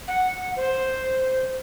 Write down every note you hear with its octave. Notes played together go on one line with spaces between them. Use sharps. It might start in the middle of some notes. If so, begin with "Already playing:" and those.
F#5
C5